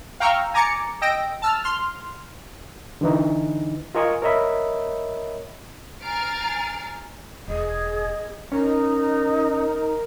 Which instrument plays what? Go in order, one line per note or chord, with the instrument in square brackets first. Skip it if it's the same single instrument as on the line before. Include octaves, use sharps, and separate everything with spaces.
[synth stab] F5 G5 A#5 C#6 E6 F6
G#5 A#5 D6 A6 C#7
D#5 G5 E6 A#6 D7
A5 E6 F6
C6 F6
[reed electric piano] D3 E3 D#4
F4 A#4 D#5 G#5 C#6 D#6
A#4 C#5 D#5 E5 B5
[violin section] G#5 A#5 F6 A6 C7 D7
[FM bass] E1 [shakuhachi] G#4 [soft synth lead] D#5
[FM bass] C#4 [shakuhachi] D#4 [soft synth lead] A#4